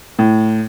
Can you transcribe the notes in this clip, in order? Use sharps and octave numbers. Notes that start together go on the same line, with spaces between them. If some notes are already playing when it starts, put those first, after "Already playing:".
A2